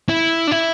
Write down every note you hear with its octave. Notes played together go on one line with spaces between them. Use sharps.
E4
D4
E4